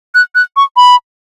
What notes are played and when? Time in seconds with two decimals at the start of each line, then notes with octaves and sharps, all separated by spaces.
0.15 F#6
0.35 F#6
0.57 C#6
0.77 B5